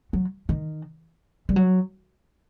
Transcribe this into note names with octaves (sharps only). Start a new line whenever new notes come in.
F#3
D#3
G3
F#3